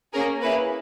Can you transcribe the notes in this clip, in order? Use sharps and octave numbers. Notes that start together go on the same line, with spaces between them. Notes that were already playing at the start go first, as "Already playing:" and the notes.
A#3 C#4 G#4 A#4 A#5
A#3 C#4 E4 G#4 B4 B5